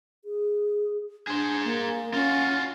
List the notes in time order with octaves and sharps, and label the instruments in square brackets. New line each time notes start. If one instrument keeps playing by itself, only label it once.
[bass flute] G#4
[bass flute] D4 [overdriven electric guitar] G#4 C5
[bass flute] A#3
[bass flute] C#4 [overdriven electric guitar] F4 F#4